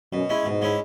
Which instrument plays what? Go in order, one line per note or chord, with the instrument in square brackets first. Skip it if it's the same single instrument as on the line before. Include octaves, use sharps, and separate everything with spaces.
[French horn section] F#2 [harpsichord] B2
[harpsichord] G#3 C#4 E4
[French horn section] G#2 [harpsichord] B2
[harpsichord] G#3 C#4 E4